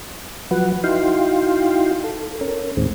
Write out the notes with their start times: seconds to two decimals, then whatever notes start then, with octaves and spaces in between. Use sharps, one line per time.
0.51 F3 F#3 B4 F#5
0.84 D#4 E4 F#4 F5 G5 C6
2.04 A4
2.41 C#4 A#4
2.77 D#2 A2 D#3 G#3 C4